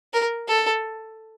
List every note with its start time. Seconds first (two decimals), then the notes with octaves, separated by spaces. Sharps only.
0.13 A#4
0.48 A4